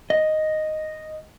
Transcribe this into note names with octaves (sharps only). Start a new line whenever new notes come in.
D#5